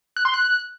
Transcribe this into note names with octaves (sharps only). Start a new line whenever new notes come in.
F#6
C6
F#6